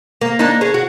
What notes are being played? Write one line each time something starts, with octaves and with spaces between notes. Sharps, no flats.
A#3
A#3 D4 D#4
C#4 G#4
F#4